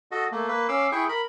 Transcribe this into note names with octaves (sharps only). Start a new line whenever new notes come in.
F#4 A4 D#5
A3 A#3
A#3 B4
C#4 F5 D6 E6
E4 G#4 G5 C#6
A#4 B5